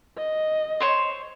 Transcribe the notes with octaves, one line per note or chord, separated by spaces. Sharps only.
D#5
C5 C#5 C6